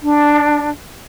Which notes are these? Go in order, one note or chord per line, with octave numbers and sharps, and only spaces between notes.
D4